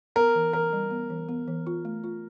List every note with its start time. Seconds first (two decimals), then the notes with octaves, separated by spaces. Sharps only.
0.16 B3 A#4
0.35 E3
0.53 E3 A#4
0.73 G3
0.91 B3
1.10 E3
1.29 B3
1.48 E3
1.67 F4
1.85 A3
2.04 F4